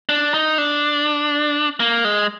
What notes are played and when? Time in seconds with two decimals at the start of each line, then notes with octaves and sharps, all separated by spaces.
0.09 D4
0.34 D#4
0.58 D4
1.80 A#3
2.04 G#3